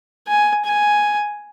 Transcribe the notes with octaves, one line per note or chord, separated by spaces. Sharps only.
G#5
G#5